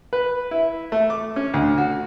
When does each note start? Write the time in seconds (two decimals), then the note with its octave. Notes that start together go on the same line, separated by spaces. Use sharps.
0.13 B4
0.51 E4
0.92 A3
1.10 D6
1.36 C#4
1.54 D2
1.78 F#4